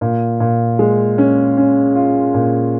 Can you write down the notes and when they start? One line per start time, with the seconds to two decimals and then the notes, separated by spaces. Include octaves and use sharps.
0.01 A#2
0.40 A#2
0.79 G#3
1.18 C#4
1.57 C#4
1.95 F4
2.34 A#2